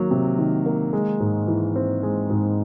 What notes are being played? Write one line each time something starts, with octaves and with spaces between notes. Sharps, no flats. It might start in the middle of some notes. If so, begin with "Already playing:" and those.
Already playing: D#3 F#3 A#3
C3
D#3
A#3
G#3
G#2
E3
C4
G#3
G#2